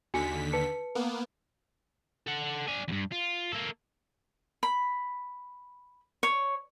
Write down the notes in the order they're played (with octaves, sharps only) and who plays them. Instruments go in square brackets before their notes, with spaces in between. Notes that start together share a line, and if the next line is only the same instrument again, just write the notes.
[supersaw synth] D#2 D3 B6 [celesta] F#4 G#5 C#7
[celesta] B4 A5 C#7
[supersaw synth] A#3 B3
[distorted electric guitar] A4 F#5
D4 G#5
E2 G2
F4
A#3 A4
[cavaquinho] B5
C#5